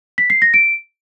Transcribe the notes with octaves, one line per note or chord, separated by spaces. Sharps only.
B6
C7
A#6
D7